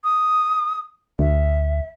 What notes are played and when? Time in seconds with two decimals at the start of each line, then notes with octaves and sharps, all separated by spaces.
0.04 D#6
1.19 D2 E5